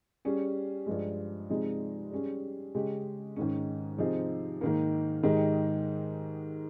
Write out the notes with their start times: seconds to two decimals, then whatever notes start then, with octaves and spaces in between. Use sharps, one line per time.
0.25 G3 C#4 G#4
0.86 G2 F3 G#3
1.50 C3 F3 G#3 D#4
2.12 G3 C#4 G#4
2.75 C#3 G#3 C#4 G4
3.36 G#2 D#3 G#3 C#4
3.98 C3 F3 C4 D#4 G#4
4.61 G#2 D#3 A#3
5.23 G#2 D#3 G#3 D#4 G4